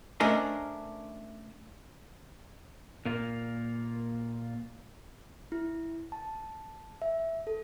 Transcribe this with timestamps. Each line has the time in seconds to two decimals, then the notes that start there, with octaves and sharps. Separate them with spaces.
0.20 A3 C#4 D4 A#4 C5 D#5
3.05 A#2 A#3 F4
5.52 E4
6.12 A5
7.02 E5
7.47 A4